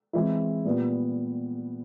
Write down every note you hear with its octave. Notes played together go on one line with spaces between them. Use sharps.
E3 G#3 C4 E4
A#2 G3 B3